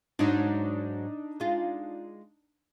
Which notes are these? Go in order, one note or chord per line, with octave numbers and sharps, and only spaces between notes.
G#2 F#3 D4 D#4
G#3 F4